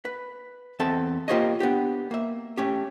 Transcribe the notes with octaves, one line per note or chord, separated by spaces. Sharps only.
B4
E2 C4 A4 E5 A5
A#3 F4 G4 C5 C#5 D#5
B3 D4 G4
A#3 E5
A3 C#4 G4